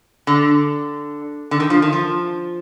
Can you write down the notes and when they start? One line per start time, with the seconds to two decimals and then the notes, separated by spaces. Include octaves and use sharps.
0.27 D3
1.51 D3
1.60 D#3
1.70 F3
1.82 D#3
1.93 F3